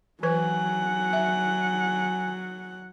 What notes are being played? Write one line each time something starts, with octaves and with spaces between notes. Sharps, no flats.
E3 F#3 B4 F#5 G#5
E5